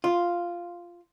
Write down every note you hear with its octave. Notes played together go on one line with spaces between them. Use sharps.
F4